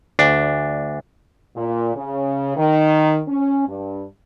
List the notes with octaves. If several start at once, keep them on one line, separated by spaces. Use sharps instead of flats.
D2 D4
A#2
C#3
D#3
C#4
G2